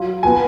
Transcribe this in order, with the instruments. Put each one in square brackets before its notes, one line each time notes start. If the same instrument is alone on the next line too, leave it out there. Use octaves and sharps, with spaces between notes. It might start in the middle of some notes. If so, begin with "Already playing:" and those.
Already playing: [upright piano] F#3 F4
[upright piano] F3 B3 F4 [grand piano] G#5